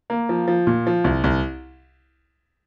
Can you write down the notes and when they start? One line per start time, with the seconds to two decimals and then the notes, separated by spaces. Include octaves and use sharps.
0.10 A#3
0.29 F3
0.48 F3
0.67 A#2
0.87 F3
1.04 C2
1.24 C2